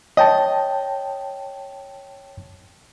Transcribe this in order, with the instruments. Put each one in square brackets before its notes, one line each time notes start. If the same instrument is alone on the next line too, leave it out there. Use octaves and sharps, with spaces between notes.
[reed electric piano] C#5 G5 A5 [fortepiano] D#5